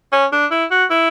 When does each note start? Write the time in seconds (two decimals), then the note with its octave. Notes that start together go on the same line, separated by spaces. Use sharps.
0.12 C#4
0.32 D4
0.51 E4
0.71 F#4
0.90 E4